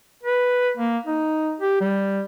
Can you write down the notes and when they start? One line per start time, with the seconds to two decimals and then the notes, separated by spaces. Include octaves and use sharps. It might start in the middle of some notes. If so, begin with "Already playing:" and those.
0.23 B4
0.77 A#3
1.06 D#4
1.60 G4
1.81 G3